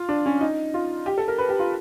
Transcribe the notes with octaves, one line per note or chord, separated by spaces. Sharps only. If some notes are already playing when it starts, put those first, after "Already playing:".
Already playing: F4
D4
C#4
D#4
F4
G4
A4
A#4
B4
G4
F4